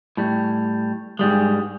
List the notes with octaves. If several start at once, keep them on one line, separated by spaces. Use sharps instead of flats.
A2 G3
G#2 G3 G#3